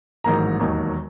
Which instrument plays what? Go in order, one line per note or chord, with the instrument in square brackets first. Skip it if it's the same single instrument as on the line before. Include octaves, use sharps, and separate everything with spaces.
[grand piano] A1 G#2 D#3 F#3 A#3 A#5
E1 D#2 D#3 F#3 A#3